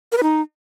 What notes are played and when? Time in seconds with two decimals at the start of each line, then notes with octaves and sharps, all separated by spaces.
0.12 A#4
0.17 B4
0.23 D#4